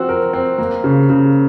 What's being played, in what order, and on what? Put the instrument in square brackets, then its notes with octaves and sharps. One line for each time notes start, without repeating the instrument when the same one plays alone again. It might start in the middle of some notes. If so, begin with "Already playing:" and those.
Already playing: [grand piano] F3 C4 F#4
A#4
C4
A#3
C#3
C#3